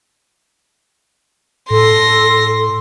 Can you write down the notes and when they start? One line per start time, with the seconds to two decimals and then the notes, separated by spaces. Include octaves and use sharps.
1.70 A2 A4 C6 A#6